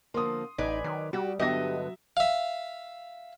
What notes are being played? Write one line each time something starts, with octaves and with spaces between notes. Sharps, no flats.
D3 F3 A#3 C6 D#6
A1 D#4 B4 D5 G#5
D#3 F#3
G3 F#4 G4
G2 D3 F#3 B3 G4 D#5 E5 A#6
E5 F5